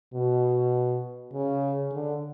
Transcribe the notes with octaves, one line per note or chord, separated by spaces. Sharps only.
B2
C#3
D3